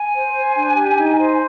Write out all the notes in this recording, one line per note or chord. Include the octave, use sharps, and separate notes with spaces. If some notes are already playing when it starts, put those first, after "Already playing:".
Already playing: G#5
C5
C5
D4
G4
D#4
C5